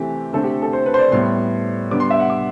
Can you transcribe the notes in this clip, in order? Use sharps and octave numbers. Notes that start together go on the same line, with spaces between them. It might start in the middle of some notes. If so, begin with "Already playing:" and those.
Already playing: C3 E3 A3 C4 G4
D3 A3 C4 A4
G4
A4
C5
B4
C5
D5
A2 G3 B3 C6
D3 G3 B3 D6
C6
E5
F#5
D6